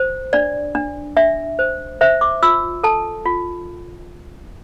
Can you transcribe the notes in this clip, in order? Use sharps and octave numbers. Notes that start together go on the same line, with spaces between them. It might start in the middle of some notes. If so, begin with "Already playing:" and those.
Already playing: C5
D4 D5
D4
D4 E5
C5
C5 E5
D6
F4 E6
A4 A5
F4